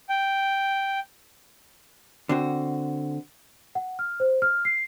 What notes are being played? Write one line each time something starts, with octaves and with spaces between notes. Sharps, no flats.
G5
D3 C4 F#4
F#5
F6
C5
F6
C7